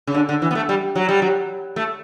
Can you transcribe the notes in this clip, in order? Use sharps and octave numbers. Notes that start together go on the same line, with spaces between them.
C#3
D3
D3
E3
B3
A3
G3
F#3
G3
F#3
A3